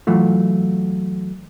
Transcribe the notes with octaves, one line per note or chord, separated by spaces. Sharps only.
E3 F#3 A3 F4